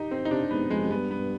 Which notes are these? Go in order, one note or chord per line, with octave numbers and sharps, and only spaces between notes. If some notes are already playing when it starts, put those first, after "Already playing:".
Already playing: D#4 G4
C4
D#4
C3 D4
G#2 B3
F2 G#3
F2
G2 B3
B3